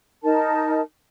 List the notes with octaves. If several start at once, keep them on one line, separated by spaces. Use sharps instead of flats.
D#4 A#4 A5